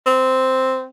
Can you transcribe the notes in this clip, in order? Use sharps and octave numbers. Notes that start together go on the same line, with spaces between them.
C4